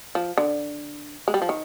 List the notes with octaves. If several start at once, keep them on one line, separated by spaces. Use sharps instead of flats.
F3
D3
G#3
G3
F3
D#3